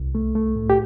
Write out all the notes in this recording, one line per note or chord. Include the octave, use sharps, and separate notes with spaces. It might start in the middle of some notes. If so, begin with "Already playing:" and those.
Already playing: C2
A3
A3
A2
G4